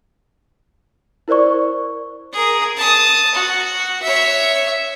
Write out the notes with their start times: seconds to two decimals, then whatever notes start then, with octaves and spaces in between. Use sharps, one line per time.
1.28 E4 A#4 C5 D5 C#6
2.33 G#4 A#4
2.77 A5 D#6
3.35 F#4
4.02 C#5 E5